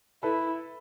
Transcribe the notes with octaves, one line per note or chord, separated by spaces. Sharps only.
E4 A4 B4